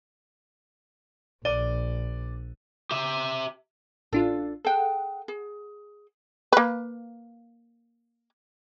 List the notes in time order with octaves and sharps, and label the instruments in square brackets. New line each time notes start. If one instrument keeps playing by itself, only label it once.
[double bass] A#1 [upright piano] D5 D#7 G7
[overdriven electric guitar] G4 E5
[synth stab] A1 D4 F4 [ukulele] A4
[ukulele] G#4 G5 [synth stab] A4 F#5
[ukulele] G#4
[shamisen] A#3 B4